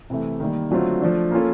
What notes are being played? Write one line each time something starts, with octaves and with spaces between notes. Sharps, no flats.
C3 E3 A3
D#3 G3 A#3
D3 F#3 A3 C4 F4
F3 A3 D4
A#3 C#4 F4 A4